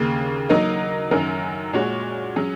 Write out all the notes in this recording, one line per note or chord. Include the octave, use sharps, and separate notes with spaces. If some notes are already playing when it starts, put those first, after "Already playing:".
Already playing: D#2 C#3 A#3
F#3 A#3 D#4 A#4 D#5
F#2 D#3 F#3 C#4 A#4
A#2 G#3 F#4 C#5
F#3 C#4 G#4